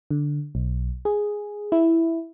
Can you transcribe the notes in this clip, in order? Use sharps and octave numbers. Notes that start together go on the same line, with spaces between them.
D3
B1
G#4
E4